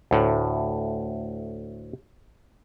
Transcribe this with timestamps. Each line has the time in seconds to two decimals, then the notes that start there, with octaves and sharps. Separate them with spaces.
0.11 D2 A2